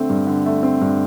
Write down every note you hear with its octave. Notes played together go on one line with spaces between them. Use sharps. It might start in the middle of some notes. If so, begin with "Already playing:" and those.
Already playing: D3 A3 C4
G2
D3
A3
C4
G2